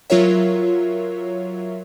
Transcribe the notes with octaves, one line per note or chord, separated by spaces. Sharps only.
F#3 F4 A#4 C#5 E5